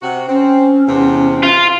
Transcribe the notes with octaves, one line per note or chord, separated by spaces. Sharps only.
C3 F#4
C4 C#4
E2 C3
F4